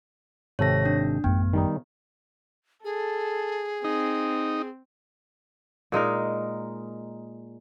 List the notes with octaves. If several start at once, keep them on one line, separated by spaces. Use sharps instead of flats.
G#1 C3 A4 C#5 A#6
D4
A1 F#2 A3 B3 G5
D#3 G3 D#4
G#4 A4
C4 D#4
A#2 G#3 D#4 A#4